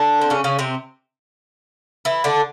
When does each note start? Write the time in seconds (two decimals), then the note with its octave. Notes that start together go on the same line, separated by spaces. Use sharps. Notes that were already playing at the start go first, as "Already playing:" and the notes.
Already playing: D3 D4
0.21 C4
0.30 C#3 C#4
0.44 C#3 C#4
0.59 C3 C4
2.05 E3 E4
2.24 D3 D4